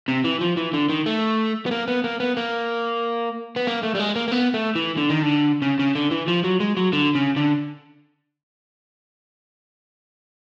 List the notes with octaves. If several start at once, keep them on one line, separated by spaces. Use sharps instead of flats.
C3
E3
F3
E3
D3
D#3
A3
B3
A#3
B3
A#3
B3
A#3
B3
A#3
A3
G3
G#3
A#3
A#3
B3
A3
E3
D3
D#3
D3
C#3
C#3
D3
E3
F3
F#3
G#3
F#3
D3
C#3
D3